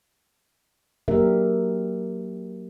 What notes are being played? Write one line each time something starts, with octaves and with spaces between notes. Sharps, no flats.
F#3 A#3 D4 G4 A#4 E5